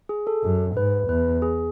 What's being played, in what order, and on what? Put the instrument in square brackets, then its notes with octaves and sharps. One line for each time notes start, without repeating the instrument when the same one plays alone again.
[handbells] G#4
A4
[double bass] F#2
[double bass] G#2 [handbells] B4
[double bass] E2 [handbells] B4
[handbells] G#4